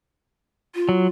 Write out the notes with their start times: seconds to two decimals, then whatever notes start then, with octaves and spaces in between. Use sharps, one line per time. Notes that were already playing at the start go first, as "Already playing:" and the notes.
0.75 F4
0.89 F#3